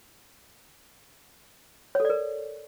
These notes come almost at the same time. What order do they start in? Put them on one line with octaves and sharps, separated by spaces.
C#5 A4 D5 A#4